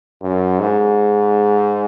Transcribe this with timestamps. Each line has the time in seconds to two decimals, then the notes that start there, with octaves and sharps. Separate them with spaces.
0.22 F#2
0.60 G#2